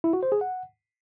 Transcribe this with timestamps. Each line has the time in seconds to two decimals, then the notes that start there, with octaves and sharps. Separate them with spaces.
0.04 E4
0.13 F#4
0.23 C5
0.32 G#4
0.41 F#5